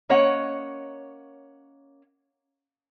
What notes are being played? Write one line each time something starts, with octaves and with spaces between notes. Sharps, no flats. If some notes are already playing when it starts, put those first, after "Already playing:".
A#3 C#4 C#5 D#5 F#5